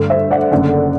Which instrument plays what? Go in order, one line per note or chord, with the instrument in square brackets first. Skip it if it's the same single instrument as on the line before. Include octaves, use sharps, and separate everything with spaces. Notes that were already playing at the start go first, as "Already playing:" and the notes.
Already playing: [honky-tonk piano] G2 D3 A3
C5 E5
D5 F#5
F#1 F#2 D3 A3 D5 F#5